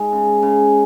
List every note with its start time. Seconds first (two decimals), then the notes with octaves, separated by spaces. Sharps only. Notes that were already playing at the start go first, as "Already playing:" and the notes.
Already playing: G#3 D#4
0.12 C#3
0.43 C#3